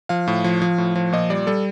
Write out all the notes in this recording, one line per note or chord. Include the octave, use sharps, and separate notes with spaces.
F3 F5
A2
F3
F3
A2
F3
A#2 D#5
G3 D5
G3 A4